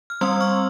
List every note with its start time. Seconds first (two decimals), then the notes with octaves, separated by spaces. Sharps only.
0.10 F6
0.21 G3 C4 C6 E6
0.40 C#6 F6